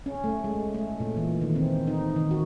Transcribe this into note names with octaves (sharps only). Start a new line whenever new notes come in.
C#4
A3
G#3
A3
A#2
E3
D#3
C4
D#4
D#3
F#4